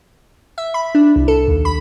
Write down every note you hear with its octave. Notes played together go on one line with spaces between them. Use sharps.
E5
B5
D4
C2
A4
D#2
B5